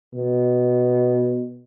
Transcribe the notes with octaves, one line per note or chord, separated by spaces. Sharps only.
B2